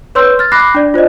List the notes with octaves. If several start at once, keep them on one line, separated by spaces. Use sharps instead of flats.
B4 C#5 C6 E6 G6
F6 A6
B5 D6 F#6 A#6 C7
D4 D5
F4 C5 D5 D#5